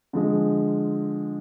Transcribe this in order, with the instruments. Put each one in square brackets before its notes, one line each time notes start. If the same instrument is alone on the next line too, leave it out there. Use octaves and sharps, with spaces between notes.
[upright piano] D3 F3 G#3